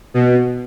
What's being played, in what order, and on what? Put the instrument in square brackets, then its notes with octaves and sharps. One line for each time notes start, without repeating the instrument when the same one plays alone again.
[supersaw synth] B2